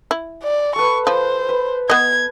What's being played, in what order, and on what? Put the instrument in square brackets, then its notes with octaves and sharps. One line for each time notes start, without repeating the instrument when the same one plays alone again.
[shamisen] E4
[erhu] D5
[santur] A4 B4 [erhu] C#6
[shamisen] F3 [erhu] C5
[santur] B4
[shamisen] B3 D#5 [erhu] G#6